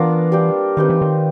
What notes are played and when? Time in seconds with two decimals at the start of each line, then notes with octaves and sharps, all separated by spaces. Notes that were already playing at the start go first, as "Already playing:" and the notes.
Already playing: E3 B3 D4 F4 A#4
0.32 G3 A#3 D4 G4
0.77 D#3 C4 D#4 G4 B4
0.90 E3
1.02 D#3